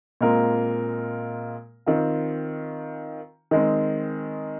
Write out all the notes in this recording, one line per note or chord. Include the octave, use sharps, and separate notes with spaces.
A#2 G#3 C4 F4 A#4
D#3 C4 F4
D#3 G#3 C4